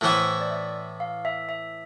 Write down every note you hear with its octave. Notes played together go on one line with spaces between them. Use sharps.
A2 E3 B3 E4 C5
D5
E5
F5
E5
E5